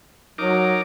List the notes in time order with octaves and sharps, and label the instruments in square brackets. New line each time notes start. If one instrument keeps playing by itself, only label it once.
[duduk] F#3 [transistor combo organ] D#4 A#4 D6